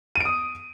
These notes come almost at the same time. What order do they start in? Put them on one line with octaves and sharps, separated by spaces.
D#7 D7 D#6